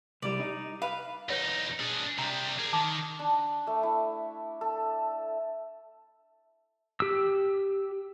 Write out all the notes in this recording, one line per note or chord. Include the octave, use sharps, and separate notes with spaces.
C2 G3 D5
D#4
B4 F5
E2 D#4 B4 C#5 F#5
D4 G#4
C3 G3 A#5 C6
G#4 A#4
D#3 A5 D6
D4
A3
E4
A4
G4 E6